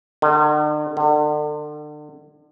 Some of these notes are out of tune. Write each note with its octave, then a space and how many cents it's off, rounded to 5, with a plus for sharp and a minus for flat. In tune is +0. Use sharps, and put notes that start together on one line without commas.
D3 +45
D3 +35